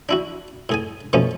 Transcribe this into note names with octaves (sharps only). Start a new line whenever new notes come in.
D4 E4 F#4
A2 G#4 G#5
B2 F3 A3 B3 C#4